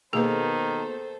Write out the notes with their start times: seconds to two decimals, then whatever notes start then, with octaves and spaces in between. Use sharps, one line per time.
0.13 B2 D#3 A#3 G#4 A4 B4 C5